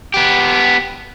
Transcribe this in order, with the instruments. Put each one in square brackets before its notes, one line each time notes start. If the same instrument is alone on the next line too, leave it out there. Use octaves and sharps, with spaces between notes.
[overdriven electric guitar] B3 G4